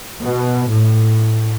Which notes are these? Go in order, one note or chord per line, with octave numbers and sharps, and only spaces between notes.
B2
A2